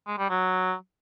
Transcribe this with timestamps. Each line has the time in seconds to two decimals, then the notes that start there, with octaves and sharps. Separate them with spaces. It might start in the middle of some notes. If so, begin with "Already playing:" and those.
0.07 G#3
0.18 G3
0.29 F#3